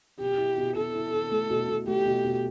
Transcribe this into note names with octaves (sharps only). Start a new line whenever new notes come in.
B2 G4
E4
B2
B2 A4
E4
E4
A3
B2
B2
A3 G4
B2
B2